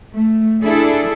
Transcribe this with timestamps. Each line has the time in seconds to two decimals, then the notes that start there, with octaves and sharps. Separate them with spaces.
0.13 A3
0.64 D4 E4 G#4 A4